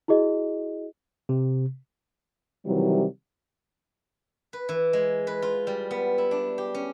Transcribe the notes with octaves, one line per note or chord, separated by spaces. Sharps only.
E4 F#4 G#4 D#5
C3
C3 D#3 E3 F#3 G3
B4
E3
G#3
B4
F4
G3
B3
E4
D4
G4
C#4